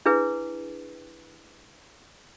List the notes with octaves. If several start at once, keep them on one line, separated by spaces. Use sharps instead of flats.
D4 E4 G#4 B4